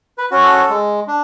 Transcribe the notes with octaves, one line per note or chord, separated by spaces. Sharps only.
B4
C#4 F#4
A4
G#3
D4